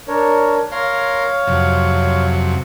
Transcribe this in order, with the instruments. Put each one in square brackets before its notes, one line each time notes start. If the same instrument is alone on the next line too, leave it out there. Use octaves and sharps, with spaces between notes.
[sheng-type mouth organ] D4 A#4 C#5
[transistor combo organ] A#4 C6 [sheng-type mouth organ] C#5 F5
[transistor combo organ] F2 C3 F#3